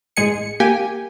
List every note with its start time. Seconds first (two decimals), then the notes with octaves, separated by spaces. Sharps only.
0.17 A1 G#3 G#4 C#7
0.60 A#3 G4 G#5